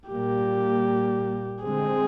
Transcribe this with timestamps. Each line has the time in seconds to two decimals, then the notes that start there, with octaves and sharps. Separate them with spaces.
0.10 A#2 G3 A#3 G4
1.64 D3 G#3 C4 G#4